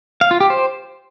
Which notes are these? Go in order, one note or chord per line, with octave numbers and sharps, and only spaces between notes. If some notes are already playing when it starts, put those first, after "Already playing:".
F5
F4
G4
C5